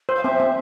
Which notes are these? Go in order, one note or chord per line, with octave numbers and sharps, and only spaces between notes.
C5
F5
C4 E5
C4